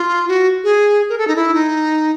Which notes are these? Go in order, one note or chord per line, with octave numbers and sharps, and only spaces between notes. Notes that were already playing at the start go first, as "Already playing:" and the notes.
Already playing: F4
F#4
G#4
A#4
A4
D#4
E4
D#4